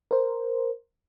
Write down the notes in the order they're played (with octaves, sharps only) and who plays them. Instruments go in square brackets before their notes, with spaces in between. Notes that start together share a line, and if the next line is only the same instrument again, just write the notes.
[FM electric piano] A#4 C5